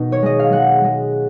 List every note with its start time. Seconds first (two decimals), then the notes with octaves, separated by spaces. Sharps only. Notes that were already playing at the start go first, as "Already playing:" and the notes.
Already playing: B2 D#3
0.12 C#5
0.23 G#3 D#5
0.39 F5
0.53 G#3 F#5
0.84 G#3